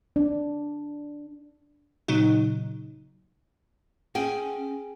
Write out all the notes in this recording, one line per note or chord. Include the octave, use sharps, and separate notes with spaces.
D4
A#2 C#3 F#3 D#4
C#4 G#4 G5 G#5